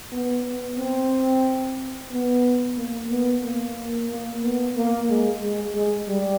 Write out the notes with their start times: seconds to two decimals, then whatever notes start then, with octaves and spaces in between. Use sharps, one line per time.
0.12 B3
0.46 B3
0.78 C4
2.11 B3
2.77 A#3
3.10 B3
3.43 A#3
4.10 A#3
4.43 B3
4.76 A#3
5.09 G#3
5.42 G#3
5.74 G#3
6.08 G3